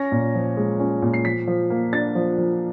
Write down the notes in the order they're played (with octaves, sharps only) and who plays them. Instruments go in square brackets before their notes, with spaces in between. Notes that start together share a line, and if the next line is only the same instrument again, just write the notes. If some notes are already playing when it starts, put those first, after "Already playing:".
Already playing: [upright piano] C#4 A#6
A#2
F3
G#3
C#4
A#2
C7
F3 B6
F3
A#3
D4 A6
F3
F3